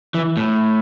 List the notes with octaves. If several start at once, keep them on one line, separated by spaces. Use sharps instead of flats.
E3
A2